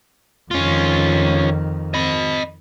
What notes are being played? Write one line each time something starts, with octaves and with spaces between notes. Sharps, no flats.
F2 D#3 C#4 F4
D#5 B5